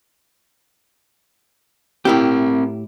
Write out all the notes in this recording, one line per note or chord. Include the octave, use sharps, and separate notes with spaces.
A2 C4 E4 G4 A#4